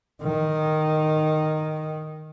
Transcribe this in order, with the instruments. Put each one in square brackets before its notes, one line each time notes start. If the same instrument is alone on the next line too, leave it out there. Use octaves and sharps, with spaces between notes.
[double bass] D#3